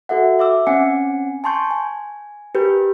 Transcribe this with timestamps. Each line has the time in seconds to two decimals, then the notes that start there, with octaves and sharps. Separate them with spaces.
0.09 F#4 A4 E5 F#5
0.39 E5 D6 E6
0.67 C4 C#4 F#5 G#5 C#7
1.44 G#5 A5 C6 C#6 G6
1.71 G#5
2.55 G4 A#4 B4 G6